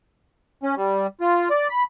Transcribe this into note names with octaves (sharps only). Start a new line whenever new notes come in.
C#4
G3
F4
D5
B5